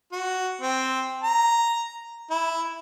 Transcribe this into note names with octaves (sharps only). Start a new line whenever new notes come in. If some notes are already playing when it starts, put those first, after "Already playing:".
F#4
C4
A#5
E4